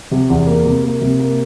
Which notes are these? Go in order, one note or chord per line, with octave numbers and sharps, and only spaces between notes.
C3
E2
A#3
C3
A#3
C3
A#3